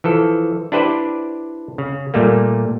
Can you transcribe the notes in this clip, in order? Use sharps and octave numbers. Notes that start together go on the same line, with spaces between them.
E3 F3 A4
D4 E4 G4 B4 C5 D5
C#3
A#2 G3 A3 A#3